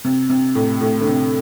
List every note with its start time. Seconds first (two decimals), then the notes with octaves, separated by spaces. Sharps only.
0.04 C3
0.29 C3
0.55 A2
0.81 A2
1.00 D3
1.07 C3